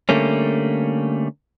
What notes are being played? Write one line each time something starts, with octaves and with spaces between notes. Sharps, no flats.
D3 G3 A3 A#3 C#4